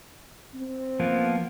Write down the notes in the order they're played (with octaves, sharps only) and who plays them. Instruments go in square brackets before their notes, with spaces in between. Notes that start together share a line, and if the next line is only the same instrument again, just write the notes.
[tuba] C4
[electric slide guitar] F3 A#3 B3